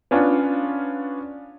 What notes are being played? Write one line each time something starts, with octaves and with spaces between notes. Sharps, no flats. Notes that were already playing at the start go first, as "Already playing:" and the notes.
B3 C#4 D4 F4